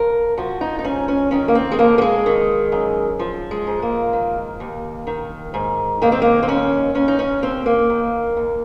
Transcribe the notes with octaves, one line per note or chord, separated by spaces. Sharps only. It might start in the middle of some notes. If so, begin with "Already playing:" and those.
Already playing: F2 A#4
F3 F#4
D#4
D#4
G#2 C#4
C#4
D#3 C#4
A#3
C4
G#3
F2 A#3
A#3
G#3
D#3
F#2
F3
G#3
G#2
A#3
D#3
D#2
D#3
G#2
D#3 A#3
C4
A#3
C4
D#2 C#4
D#2 C#4
D#4
C#4
D#2 C4
A#3
D#3
D#2